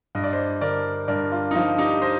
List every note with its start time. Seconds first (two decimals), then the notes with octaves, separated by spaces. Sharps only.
0.15 G2 D#5
0.24 D5
0.32 C5 D#5
0.61 D3 A#4 D5
1.08 G2 A#4 D5
1.32 F4
1.51 D#4
1.55 F3 F4
1.78 D#4 G4
2.02 C5 D#5